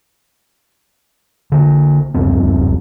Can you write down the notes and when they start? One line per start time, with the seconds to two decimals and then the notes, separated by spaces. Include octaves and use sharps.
1.52 D3 A#3
2.14 D1 C2 F#2 C4